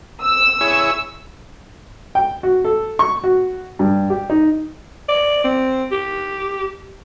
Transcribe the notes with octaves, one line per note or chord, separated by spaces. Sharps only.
E6
E4 G#4 C#5
G5
F#4
A4
C#6
F#4
G2
G4
D#4
D5
C4
G4